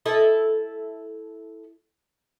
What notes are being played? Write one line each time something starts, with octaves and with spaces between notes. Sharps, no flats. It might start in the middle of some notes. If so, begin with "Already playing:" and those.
E4 A4 D#5